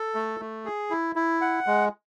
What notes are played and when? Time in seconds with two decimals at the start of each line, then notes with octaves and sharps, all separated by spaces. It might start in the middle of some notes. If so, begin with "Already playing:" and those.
Already playing: A4
0.15 A3
0.40 A3
0.65 G#4
0.91 E4
1.16 E4
1.41 F#5
1.67 G#3